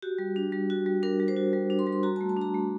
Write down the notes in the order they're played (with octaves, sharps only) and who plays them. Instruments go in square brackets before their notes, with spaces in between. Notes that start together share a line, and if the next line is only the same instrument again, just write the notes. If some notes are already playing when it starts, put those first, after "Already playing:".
[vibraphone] F#4 G4
G3
D4
G3
F#4
G3
D4 A#4
G3
C5
F#4
G3
D4
C6
G3
C6
F#4 A#5
A5
A3
A5
D4 A#5
A3